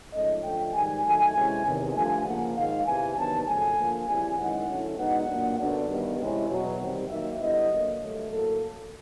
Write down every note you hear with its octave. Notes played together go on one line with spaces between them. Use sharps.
G#2 F3 A3 C#4 D#5
D3 F3 A3 G5
G#2 D#3 G3 G#5
D#3 F#3 A3 G#5
C3 E3 G#3 C#4 E4
E2 C3 D#3
G2 D3 F3 A3 D4 G#5
C#3 F3 A#3 F#5
G#2 D#3 G#3 F5
E2 C3 E3 G#5
C3 D#3 F#3 B3 D4 A5
F2 C#3 F#3 A3 G#5
D3 F3 A#3
C#3 E3 G3 C4 E4 G#5
F#2 D#3 G#3 C#4 E4 F#5
D3 F#3 A3 C#4 E4
E2 B2 G#3 B3 D#4 F#5
A#2 F#3 A#3 D4
F#2 D3 F#3 B3 D4
G2 D#3 G3 B3
C3 E3 G#3 C#4 E4
E2 B2 F#3
C3 D#3 G3 C4
D#3 F#3 A#3 D#4 E5
D3 G3 B3 E4 D#5
D3 F#3 A#3
G2 D3 F#3 A3
A2 F#3 A#3 A4